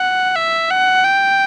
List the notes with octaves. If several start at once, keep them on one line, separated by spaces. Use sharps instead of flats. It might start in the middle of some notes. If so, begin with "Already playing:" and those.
Already playing: F#5
E5
F#5
G5